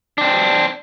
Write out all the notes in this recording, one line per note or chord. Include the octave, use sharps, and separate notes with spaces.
C4 D4